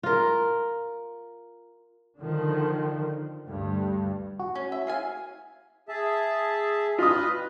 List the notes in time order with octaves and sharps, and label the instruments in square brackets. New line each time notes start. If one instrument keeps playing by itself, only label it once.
[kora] F4 A#4
[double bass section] D3 D#3 F3
D2 G2 G3
[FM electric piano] F#4
[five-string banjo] C#4
E5
G#4 F5 G#5
[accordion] G#4 E5 A5
[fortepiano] F4 D#6 [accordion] B4 D#5 B5